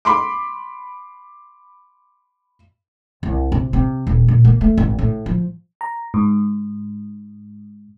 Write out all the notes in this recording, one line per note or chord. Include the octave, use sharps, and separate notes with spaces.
B5 C6 D6
C2
C3
C3
D#1
A#2
A#3
A3
G#1
A2
F3
A#5
G#2